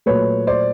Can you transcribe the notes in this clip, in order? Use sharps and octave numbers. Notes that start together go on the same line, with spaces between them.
A#2 F#3 A3 B4 C#5
C5 D5